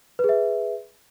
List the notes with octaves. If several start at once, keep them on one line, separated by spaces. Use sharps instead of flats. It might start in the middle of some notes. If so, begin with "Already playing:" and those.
G#4 B4 E5